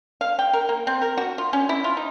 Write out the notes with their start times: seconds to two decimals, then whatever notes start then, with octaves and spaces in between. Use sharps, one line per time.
0.21 F5
0.39 G5
0.53 A#4
0.69 A#3
0.87 C4
1.02 A#4
1.17 F#4
1.38 F4
1.53 C#4
1.69 E4
1.84 F4
1.97 D#4